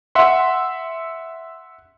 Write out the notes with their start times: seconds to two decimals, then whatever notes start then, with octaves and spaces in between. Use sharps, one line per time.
0.15 E5 F#5 C6